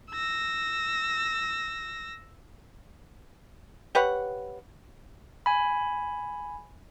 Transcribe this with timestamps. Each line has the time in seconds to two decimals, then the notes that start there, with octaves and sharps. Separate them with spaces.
0.11 E6 A#6
3.95 G4 B4 C#5 F#5
5.46 G#5 B5